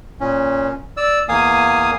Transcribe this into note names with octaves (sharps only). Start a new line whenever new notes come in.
A#2 C#4
D5 E6
E2 A#3 F5 G#5 D#6